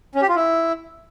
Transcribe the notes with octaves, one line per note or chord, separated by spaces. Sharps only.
C#4
G4
F4
E4